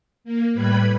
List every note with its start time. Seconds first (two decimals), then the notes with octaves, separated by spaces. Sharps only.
0.24 A#3
0.54 A2 G3 B4 B5 G#6